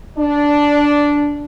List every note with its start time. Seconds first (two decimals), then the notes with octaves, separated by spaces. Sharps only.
0.17 D4